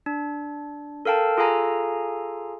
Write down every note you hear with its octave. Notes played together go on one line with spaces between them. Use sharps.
D4
A4 A#4 F5 G5 A5
F4 G#4 A4 F5 G#5 A#5